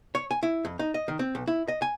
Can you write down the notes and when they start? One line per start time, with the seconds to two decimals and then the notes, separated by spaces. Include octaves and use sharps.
0.15 C#5
0.31 G#5
0.43 E4
0.65 F2
0.79 D#4
0.94 D#5
1.08 D#3
1.19 C4
1.35 B1
1.48 E4
1.68 D#5
1.82 G#5